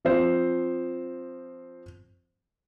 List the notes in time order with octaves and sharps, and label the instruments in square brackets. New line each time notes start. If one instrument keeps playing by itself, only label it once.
[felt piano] F3 C4 C5